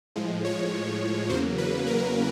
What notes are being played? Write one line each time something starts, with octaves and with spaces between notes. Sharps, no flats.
A2 F3 G#3
C#5
E2 C#3 F#3 A#3 C5
B4
A#4